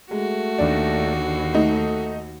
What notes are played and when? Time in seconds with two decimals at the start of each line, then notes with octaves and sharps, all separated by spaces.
0.11 G#3 A3 F#4
0.58 D#2 D4
1.16 D3
1.53 A3 D#4 A4